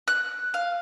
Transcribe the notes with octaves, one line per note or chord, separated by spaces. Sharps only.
F#6
F5